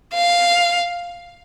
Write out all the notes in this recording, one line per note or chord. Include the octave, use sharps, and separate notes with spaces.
F5